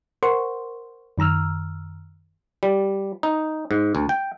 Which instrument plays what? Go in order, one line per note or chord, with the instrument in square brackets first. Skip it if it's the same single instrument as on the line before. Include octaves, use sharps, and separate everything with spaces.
[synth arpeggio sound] A#4 C5 F#5 C6 C#6
F#2 D#3 A#5 E6 F6
[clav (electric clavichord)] G3
D#4
G#2
D2
G5